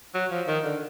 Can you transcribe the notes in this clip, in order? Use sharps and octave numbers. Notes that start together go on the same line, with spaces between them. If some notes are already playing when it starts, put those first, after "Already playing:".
F#3
F3
D#3
D3